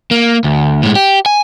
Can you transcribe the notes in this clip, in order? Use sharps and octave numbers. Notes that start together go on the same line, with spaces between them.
A#3
D2
A2 G#3
G4
G#5